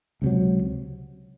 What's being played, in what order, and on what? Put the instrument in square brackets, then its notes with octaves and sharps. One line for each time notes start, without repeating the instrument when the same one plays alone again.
[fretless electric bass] C#2 C3 F#3